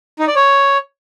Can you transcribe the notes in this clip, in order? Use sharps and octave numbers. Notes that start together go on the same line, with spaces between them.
D#4
D5
C#5